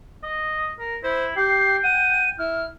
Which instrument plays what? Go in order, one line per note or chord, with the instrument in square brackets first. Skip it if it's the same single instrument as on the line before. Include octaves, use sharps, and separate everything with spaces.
[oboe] D#5
A#4
[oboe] E4 [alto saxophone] C5
[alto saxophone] G4 [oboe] G5 [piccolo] C7
[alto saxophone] F#5 [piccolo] D#7
[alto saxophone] E4 [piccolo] F6